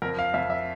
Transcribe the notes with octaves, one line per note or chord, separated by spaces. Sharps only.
F2 A#4
F5
F2 E5
E5